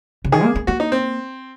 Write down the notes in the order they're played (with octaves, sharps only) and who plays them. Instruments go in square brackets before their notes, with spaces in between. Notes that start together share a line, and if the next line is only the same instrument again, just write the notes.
[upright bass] C#3
[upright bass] D#3 [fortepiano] G#4
[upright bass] A#3
A#3
[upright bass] A#3 [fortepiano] F#4
[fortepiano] D#4
C4